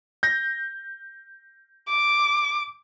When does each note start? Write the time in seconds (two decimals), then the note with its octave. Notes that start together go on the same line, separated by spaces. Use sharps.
0.23 G6 A#6
1.89 D6